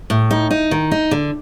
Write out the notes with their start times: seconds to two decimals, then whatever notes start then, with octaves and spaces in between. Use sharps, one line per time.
0.10 A2
0.31 D#4
0.51 D#4
0.71 D#3
0.91 D#4
1.11 D3